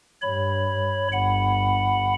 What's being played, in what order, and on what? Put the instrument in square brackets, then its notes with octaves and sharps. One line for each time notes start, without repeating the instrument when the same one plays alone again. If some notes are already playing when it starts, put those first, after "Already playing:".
[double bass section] G2 [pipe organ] C#5 B5
[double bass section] G1 [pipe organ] F#5 B5